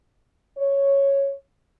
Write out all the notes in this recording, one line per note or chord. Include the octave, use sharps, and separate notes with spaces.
C#5